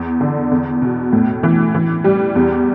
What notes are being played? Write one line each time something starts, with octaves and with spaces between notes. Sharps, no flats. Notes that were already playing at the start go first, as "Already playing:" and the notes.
Already playing: E2
D3
E2
B2
A2
E3
E3
G3
E2